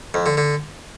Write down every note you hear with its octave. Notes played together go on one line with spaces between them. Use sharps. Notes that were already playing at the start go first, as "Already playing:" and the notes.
F2
D3
D3